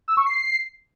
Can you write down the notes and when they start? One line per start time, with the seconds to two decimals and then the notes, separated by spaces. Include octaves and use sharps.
0.08 E6
0.17 C#6
0.26 C7